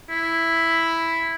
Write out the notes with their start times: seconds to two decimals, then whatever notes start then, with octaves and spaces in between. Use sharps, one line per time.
0.10 E4